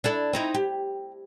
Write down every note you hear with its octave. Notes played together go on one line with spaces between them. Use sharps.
D4 E4 A4
C4 D#4 E4
G4